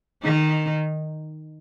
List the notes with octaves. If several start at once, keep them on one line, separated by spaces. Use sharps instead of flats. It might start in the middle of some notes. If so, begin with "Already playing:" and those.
D#3 D#4